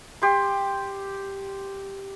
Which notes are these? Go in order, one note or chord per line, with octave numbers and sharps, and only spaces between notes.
G4 C6